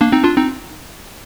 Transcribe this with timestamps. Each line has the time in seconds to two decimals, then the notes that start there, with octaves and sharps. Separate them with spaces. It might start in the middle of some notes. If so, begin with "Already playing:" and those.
0.01 A#3 D4
0.12 C4 D#4
0.24 D4 F4
0.36 C4 D#4